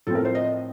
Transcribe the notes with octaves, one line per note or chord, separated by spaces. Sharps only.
A2 F3 C4 A4
A#4
C5
D#5